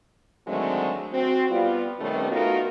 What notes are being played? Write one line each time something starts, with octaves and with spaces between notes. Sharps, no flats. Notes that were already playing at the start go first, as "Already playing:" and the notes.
D3 D#3 F#3 G#3 A3 C4
C4 F#4
G3 B3 F4
C3 D#3 G3 A3 B3 C#4
A3 B3 D#4 F4 F#4 A#4